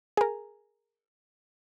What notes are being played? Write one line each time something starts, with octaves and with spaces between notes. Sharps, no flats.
G#4 A#4